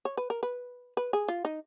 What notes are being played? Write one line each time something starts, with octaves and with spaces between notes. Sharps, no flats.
C#5
B4
A#4
B4
B4
G#4
F4
D#4